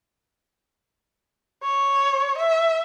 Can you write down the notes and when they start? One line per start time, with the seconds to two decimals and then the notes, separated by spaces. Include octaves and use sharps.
1.63 C#5
2.38 E5